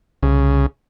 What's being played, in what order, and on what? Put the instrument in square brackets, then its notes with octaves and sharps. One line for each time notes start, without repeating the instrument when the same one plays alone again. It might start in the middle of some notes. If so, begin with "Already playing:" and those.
[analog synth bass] C2 [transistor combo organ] C#3